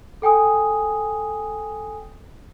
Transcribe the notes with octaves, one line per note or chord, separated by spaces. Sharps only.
A4 G5 G#5 D#6